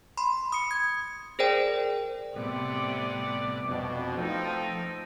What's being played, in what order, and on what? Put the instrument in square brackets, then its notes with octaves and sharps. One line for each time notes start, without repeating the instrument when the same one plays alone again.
[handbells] B5 C6
D#6 C#7
G#6
G#4 A#4 C5 D5 G5
[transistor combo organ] A2 G3 B3 [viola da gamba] C3 [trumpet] D5
[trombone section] F2 B2 [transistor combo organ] D4
[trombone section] F3 [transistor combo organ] A3 [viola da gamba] D#4 [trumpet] G5